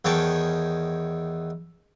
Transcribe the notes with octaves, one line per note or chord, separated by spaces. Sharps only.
E2 D#3 C#5 G5 A5 C#6